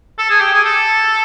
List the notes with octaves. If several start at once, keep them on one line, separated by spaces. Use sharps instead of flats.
A4
G#4
G4
G#4
A4